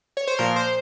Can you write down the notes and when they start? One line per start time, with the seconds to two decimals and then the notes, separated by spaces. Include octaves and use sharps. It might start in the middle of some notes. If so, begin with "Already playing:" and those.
0.17 C#5
0.27 C5
0.39 A#2 F3 A#4
0.56 C5